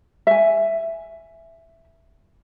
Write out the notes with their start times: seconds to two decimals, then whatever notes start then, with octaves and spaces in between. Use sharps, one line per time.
0.27 E5 G#5